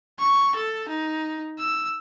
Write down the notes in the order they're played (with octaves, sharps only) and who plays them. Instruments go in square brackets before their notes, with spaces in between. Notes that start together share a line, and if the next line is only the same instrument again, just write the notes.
[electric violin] C#6
A4
D#4
E6